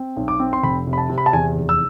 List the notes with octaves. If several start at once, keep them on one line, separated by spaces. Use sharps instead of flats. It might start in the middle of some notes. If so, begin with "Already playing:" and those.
Already playing: C4
B1
D6
C4
C6
F1 B5
C3
B5
A5
C3
B5
A5
E2 G#5
F1
E6